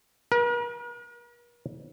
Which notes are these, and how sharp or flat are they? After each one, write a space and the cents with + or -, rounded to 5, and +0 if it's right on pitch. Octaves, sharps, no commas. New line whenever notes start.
A#4 +45